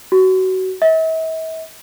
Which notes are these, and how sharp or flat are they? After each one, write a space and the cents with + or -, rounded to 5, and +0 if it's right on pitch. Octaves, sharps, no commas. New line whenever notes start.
F#4 +20
E5 -45